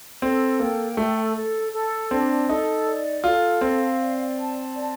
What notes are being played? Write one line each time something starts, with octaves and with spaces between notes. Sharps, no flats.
C4 A4
A#3 G5
A3 A4
A4
A4
C4 D4
D#4 A4
D5
F4 A4
C4 F5
D5
A5
D5